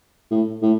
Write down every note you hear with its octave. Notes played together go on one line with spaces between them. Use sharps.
A2
A2